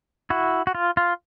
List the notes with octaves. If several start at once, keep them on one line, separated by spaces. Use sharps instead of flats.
E4 F#4
F#4
F4
F4